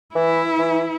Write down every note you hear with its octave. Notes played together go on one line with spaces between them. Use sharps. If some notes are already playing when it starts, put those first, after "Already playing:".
E3 E4
E3